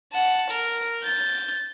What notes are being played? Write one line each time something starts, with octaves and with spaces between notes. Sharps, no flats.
F#5 A5
A#4
G6 A6